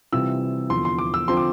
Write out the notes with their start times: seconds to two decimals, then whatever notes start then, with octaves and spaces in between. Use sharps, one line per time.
0.12 C3 E3 G3 C4 F4 E6
0.70 E2 D3 F3 C6
0.85 C6
0.98 D6
1.14 E6
1.28 D3 F3 C4 F4 C6
1.37 D6